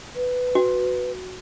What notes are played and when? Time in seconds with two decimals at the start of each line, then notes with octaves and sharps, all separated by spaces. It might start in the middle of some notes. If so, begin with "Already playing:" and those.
0.16 B4
0.55 F#4